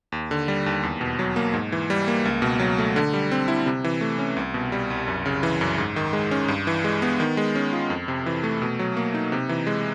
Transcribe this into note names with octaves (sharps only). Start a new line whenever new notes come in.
D#2
D3
G3
D#2
E2
B2
F#3
A#3
G#2
E3
G3
A#3
C#2
B2
F#3
A3
D3
G3
C4
E4
C3
E3
A3
C#4
C2
B2
G3
C2
F#2
C#3
E3
F#2
G#2
D#3
G#3
C#4
G2
E3
G#3
B3
D#3
G#3
C#4
F4
F2
C3
E3
A3
B2
F#3
A#3
D#4
C3
E3
G#3